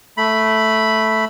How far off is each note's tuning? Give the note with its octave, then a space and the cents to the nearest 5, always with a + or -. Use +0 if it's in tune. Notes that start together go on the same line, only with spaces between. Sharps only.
A3 +0 B5 +0